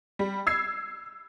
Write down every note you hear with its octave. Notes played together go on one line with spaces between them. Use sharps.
G3
E6 G#6 C7